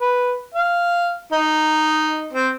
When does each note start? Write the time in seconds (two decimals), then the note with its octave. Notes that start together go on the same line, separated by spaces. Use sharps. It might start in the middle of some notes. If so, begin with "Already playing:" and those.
0.01 B4
0.55 F5
1.33 D#4
2.33 C4